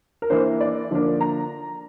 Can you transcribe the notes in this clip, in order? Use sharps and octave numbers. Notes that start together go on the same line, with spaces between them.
A#4
E3 A#3 D4 C5
D5
D3 F3 A#3 D4
A#5